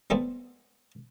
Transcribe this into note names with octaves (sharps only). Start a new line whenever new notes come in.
G3 A3 B3 C4